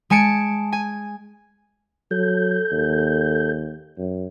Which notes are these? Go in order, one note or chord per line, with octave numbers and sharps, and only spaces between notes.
G#3 G#5 A5 C#7 D7
G#5
F#3 A4 G6
D#2
F#2